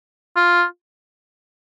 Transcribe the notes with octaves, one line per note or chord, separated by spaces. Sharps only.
F4